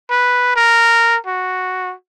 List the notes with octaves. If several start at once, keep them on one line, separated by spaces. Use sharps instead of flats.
B4
A#4
F#4